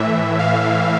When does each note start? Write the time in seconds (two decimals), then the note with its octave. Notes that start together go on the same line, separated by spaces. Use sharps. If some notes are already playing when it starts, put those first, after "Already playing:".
Already playing: A2 E3 E5
0.39 F5